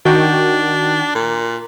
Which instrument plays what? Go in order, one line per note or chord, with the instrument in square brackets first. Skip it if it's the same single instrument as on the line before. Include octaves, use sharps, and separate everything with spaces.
[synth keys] D#3 F#4 G5 [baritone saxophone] D4
[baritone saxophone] A#2